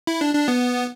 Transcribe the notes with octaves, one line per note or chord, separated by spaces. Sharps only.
E4
D4
D4
B3